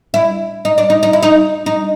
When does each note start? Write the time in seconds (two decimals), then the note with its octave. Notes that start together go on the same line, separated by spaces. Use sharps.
0.14 E4
0.65 D#4
0.78 D4
0.90 D#4
1.03 D#4
1.13 E4
1.23 D#4
1.66 D#4